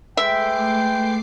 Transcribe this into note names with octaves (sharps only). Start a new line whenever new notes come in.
G#3 A3 B4 E5 G5 D6 C7